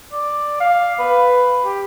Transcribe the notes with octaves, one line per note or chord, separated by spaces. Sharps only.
D5
F5
B4
G4